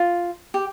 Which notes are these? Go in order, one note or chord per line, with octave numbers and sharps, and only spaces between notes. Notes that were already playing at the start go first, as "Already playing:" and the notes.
Already playing: F4
G4